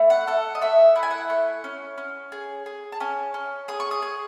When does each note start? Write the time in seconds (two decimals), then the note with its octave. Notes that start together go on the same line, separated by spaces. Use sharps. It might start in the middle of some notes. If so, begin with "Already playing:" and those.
Already playing: A3 E4
0.10 F#5
0.27 A4 F#5
0.55 D#5
0.61 A3 E5
0.96 E4 F#5
1.03 G#5
1.11 F#5
1.30 A3
1.64 C#4
1.98 C#4
2.32 G#4
2.66 G#4
2.92 A5
3.00 C#4 G#5
3.34 C#4
3.68 G#4 D#6
3.80 C#6
3.91 D#6
4.02 G#4